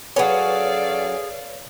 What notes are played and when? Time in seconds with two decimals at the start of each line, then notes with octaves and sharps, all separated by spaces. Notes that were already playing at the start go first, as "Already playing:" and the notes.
0.16 F#3 C#4 G#4 A4 B4 C#5 D5 F5